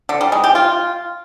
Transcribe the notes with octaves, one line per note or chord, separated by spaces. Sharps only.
D3
G3
G#3
G4
F4